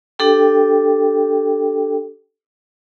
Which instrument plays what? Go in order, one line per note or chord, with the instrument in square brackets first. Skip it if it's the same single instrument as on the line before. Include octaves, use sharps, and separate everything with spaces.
[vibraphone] D4 G4 A4 G5